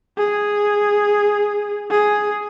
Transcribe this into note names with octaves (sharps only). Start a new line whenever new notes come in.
G#4
G#4